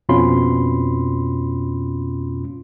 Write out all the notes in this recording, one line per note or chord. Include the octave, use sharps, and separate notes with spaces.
F2 B2 C#4 F4 B5 C6